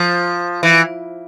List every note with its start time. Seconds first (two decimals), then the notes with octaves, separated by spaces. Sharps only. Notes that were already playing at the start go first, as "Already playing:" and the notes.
Already playing: F3
0.63 E3